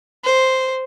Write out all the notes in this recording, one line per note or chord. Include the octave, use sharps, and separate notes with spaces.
C5